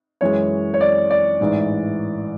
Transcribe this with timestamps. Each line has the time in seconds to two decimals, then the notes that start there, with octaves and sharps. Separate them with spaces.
0.21 F#2 E3 G#3 C#5
0.74 C#5
0.81 D5
1.11 D5
1.40 A1 G#2 E3